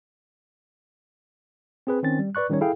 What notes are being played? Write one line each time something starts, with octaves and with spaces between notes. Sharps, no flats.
C4 G#4 B4
D#3 C4 C#4 A6
G3
B4 D5 C#6 F#6
D#3 G3 C#4 D#4 C#5
E4 G#4 A4 F5 G5